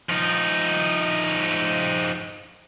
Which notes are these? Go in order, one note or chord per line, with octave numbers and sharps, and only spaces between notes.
F3 D#4